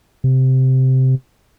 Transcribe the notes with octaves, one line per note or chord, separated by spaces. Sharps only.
C3